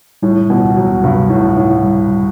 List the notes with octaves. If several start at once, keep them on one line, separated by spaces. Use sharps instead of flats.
A2 G3
B2
D2
F#3
G2 C3
A2
D2
A2
G3